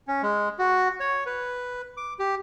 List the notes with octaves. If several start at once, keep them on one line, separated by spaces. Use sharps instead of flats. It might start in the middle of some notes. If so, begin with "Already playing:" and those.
C#4
G#3
F#4
C#5
B4
D6
G4